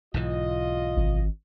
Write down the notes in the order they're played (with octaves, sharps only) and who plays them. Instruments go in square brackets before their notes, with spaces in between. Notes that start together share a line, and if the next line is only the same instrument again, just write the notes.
[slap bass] B1 G#2 E3 [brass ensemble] F4 D#5
[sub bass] G#1